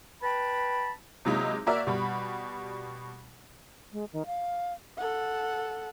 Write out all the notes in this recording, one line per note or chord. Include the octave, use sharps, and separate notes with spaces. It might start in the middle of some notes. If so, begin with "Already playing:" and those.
B4 G5 A5 B5
C3 F#3 G#3 A#3 D#4 E4
A#3 F#4 A#4 D5 E5
B2 G3 B5
G#3
D#3
F5
A4 F#5